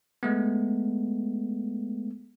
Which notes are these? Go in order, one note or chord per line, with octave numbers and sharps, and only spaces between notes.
G#3 A3 B3